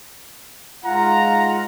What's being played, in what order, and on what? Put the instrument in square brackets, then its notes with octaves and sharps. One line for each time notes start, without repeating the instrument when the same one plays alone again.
[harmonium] G#2 F4 F#5 [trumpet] A#5